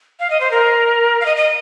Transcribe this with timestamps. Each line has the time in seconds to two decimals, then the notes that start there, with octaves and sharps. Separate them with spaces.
0.20 F5
0.30 D#5
0.41 C5
0.51 A#4
1.21 F5
1.26 D#5
1.37 D#5